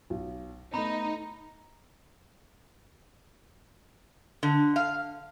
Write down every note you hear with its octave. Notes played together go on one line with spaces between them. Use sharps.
B1
A3 B3 D#4 A#5 B5
D3
F5